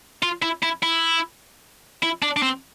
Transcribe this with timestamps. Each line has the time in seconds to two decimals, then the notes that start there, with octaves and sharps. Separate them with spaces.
0.23 F4
0.42 E4
0.63 E4
0.83 E4
2.03 E4
2.22 D4
2.37 D4
2.43 C4